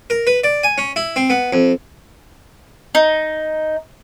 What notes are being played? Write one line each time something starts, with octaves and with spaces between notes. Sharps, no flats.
A#4
B4
D5
G#5
C#4
E4
C4
B3
F2
D#4